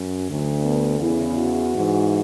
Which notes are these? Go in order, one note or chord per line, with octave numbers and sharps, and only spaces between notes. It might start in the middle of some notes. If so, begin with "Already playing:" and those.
Already playing: F#2
D2 D3
B3
E2 C#3 E3 E4
F#4
G#2 E3